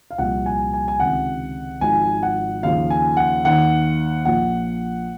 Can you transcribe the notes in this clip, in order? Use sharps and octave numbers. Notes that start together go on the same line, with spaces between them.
F5
C2 A#2 F3 F#5
G#5
G#5
G#5
C#2 C3 D#3 F#5
G#1 G#2 F3 G#5
F#5
D#2 C#3 F3 F5
G#5
F#5
D#2 D#3 F#5
A#1 A#2 F3 F#5